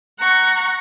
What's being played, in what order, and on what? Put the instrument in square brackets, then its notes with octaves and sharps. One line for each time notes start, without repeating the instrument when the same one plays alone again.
[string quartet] F#5 A#5 C#6